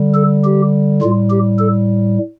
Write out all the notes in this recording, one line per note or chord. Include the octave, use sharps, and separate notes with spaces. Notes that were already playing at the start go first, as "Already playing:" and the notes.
Already playing: D3 G3
A4
G4
A2 G3 F4
G4
A4